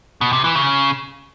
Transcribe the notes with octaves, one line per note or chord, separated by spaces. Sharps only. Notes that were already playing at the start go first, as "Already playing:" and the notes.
B2
C3
E3
C#3